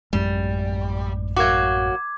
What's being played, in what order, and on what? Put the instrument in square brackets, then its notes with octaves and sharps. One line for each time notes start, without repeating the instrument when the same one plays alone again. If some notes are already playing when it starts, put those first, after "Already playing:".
[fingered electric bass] A1 F#2 G#3 [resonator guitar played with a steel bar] G3
[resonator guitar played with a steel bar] F#3 A#3 F#4 [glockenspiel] D6 G#6